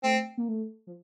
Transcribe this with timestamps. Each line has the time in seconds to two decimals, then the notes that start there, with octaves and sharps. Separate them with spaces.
0.03 A3 C4
0.38 A#3
0.49 A3
0.87 F3